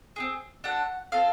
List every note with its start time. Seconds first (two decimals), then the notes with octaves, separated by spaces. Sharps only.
0.16 C4 D#4 G#4
0.64 D4 F#4 A4 F#5
1.12 C4 F4 A4 F5